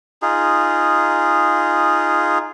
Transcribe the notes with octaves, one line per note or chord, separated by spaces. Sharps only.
D#4 F4 G#4